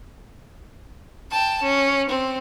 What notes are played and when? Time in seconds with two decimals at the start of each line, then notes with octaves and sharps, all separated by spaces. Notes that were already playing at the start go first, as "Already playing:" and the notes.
1.31 G5 A5
1.62 C#4
2.09 C4